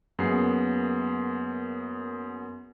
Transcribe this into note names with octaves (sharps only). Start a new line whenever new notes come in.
F#2 A#3 B3 G#4 C7